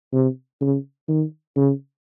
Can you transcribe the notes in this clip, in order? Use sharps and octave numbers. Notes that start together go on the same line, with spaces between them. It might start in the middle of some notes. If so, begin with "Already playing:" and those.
C3
C#3
D#3
C#3